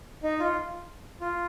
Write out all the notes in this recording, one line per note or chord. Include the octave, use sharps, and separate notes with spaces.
D#4
F4
F4